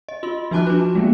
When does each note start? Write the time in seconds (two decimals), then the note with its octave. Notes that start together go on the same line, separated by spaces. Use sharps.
0.09 D#5
0.23 F4 C6
0.51 F3 F#4 G#5 A5 D6 F#6
0.67 D4 B4
0.95 G#3 A#3 B3